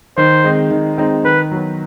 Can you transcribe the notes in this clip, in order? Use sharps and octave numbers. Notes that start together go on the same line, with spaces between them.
D#3 C5
G#3 C4 D#4
D#3
G#3 C4 D#4
D#3 B4
F#3 B3